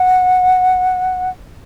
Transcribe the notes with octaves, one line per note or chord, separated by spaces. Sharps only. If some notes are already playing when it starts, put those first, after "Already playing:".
Already playing: F#5